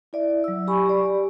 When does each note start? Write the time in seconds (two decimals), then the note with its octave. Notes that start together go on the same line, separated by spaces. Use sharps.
0.13 E4 D5 E5
0.44 F#3 E6
0.67 G4 G#5 B5 C#6
0.86 G4 D5